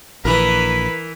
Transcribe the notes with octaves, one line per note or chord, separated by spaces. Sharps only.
A#1 E3 A#4 B4 B5